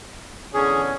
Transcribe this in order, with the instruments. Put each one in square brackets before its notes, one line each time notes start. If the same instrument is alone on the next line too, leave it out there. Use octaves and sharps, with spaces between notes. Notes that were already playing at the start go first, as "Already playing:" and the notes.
[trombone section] E2 D3 C#4 [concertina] G#4